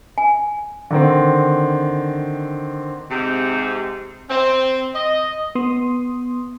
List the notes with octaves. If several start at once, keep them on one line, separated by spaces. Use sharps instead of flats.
G#5
D3 D#3 C4
G#2 C3
C4
D#5
B3 C6 D#6